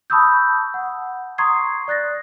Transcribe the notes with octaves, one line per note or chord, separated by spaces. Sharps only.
A5 B5 C#6 D#6 E6 G6
F#5
A#5 C6 C#6 D#6 G#6 C7
D5 F#6 A6 A#6